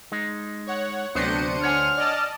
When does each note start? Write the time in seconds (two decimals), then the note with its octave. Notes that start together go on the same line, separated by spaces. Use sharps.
0.12 G#3 D#4
0.67 C#5 F#5
1.15 D2 C3 F#3 B3 D4 C5 C#7 D#7
1.63 C#5 F#5 G#5 F6
1.97 D5 D#5 A5